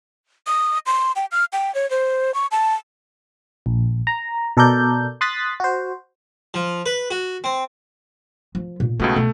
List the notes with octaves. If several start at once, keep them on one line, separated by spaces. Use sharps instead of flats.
D#6
C6
G5
F6
G5
C#5
C5
C#6
A5
A#1
A#5
B2 A4 A#4 D5 G6
C6 D#6 F#6 A6 B6
F#4 C5
F3
B4
F#4
C4
F3
A#2
C#2 B2 A3 F4
B2 A3